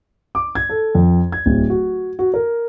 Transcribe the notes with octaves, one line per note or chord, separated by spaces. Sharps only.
D6
G#6
A4
F2
G#6
D1
F#4
F#4
A#4